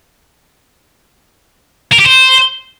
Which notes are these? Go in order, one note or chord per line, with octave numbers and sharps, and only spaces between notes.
A#4
G4
C5